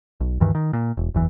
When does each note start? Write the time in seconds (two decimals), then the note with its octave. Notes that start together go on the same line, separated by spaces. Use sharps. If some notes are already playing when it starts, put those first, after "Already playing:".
0.20 B1
0.40 D2 G2 D#3 E3
0.55 D#3
0.73 A#2
0.97 E1
1.14 F#1 E2 E3